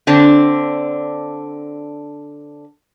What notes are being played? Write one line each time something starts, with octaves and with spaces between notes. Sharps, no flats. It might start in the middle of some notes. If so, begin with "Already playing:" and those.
D3 C4 D4